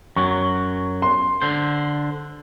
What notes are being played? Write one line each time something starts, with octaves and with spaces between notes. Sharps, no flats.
F#2 F#3 C#6
C6
D3 C5